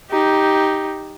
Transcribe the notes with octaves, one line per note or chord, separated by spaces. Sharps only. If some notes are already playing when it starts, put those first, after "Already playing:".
D#4 G4